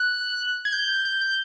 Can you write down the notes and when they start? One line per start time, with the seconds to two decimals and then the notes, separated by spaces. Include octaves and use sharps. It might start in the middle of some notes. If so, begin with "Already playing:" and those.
Already playing: F#6
0.65 G#6
0.73 G6
1.05 G6
1.21 G6